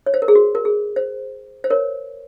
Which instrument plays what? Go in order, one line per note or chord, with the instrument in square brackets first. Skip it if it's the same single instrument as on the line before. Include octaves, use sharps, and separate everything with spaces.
[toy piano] C#5
C5
A#4
G#4
F#4
A#4
G#4
C5
C5
A#4 C#5